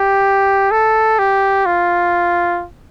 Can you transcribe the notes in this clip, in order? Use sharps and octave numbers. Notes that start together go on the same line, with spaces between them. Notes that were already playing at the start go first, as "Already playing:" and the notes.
Already playing: G4
A4
G4
F4